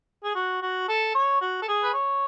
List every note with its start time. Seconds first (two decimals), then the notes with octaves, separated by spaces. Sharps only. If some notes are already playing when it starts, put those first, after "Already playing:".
0.24 G#4
0.35 F#4
0.62 F#4
0.89 A4
1.15 C#5
1.41 F#4
1.62 A4
1.68 G#4
1.84 B4
1.93 C#5